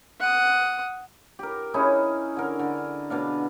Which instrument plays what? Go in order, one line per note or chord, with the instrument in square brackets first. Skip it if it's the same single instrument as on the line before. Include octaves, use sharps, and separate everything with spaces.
[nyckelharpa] F#5 D#6
[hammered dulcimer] G4 A#4
C#4 D#4 E4 G#4
D3 A#4
D3
B2 D4 F5